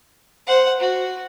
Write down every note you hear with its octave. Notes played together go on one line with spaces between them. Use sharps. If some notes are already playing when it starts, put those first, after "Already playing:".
C5 F#5
F#4